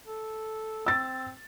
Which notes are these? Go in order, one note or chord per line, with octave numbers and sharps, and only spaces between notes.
A4
C4 E6 A6